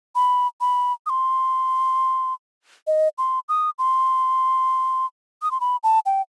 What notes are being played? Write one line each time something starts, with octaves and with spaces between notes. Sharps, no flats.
B5
B5
D#6
C6
D#5
C6
D#6
C6
D#6
C6
B5
A5
G5